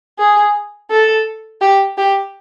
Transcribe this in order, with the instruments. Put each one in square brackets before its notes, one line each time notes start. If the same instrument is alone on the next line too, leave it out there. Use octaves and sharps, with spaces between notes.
[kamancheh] G#4
A4
G4
G4